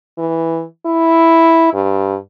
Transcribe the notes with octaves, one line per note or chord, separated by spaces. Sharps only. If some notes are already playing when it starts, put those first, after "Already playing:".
E3
E4
G2